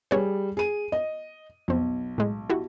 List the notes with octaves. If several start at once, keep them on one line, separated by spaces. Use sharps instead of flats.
G3 G#4 B4 C#5
G#4 D#7
D#5
B1 F2 C4
A2 G#3
E4 F#4 G4